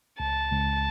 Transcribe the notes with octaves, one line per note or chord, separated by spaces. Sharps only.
C#2 A5
C#2